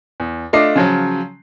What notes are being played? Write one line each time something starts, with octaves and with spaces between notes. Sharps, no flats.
E2
A3 D4 F4 D#5 D6 C7
C#3 F3 F#3